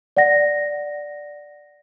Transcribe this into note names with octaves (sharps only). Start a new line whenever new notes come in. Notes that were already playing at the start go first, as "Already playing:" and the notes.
D5 F#5 A#6